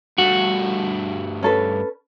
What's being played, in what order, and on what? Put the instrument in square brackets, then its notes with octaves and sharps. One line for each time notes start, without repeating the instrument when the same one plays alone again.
[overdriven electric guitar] G2 A3 [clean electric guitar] F#4
[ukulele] C#4 A4 B4